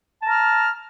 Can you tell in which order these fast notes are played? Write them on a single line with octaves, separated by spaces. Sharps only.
A5 A#5 F6